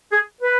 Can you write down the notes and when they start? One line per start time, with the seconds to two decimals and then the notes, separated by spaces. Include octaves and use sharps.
0.11 G#4
0.41 B4